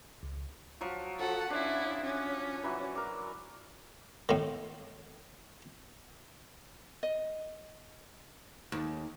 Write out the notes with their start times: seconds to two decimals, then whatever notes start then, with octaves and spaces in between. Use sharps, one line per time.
0.23 C#2
0.81 F3 F#3 C#6
1.19 F3 F#4 A4 F#5
1.50 C#4 D4 E4
2.02 C#4
2.63 E3 F#3
2.95 A#4 D6
4.29 A2 D#3
7.03 D#5
8.72 D#2